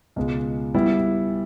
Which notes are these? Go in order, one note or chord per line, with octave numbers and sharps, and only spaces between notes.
C#2 B2 G#3
G3 B3 E4